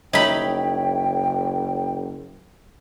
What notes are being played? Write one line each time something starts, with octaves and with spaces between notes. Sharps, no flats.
F#1 D#4 C#5 E5 G5 B5